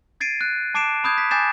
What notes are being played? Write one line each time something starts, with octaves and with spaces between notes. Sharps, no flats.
G#6 A6 C7 D7 D#7
F#6
A5 D6 C7 D7 E7
B5 D#6 G6 G#6
B6
G#5 D6 G6 A6 C7 E7